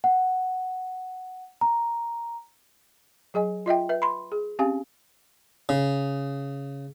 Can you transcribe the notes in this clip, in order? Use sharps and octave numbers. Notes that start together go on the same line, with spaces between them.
F#5
A#5
F#3 G#4 D#5 G#5
F4 D#5 E5 G5
B4 E5
B5 C6
G#4
C4 C#4 G4 F5 G#5
C#3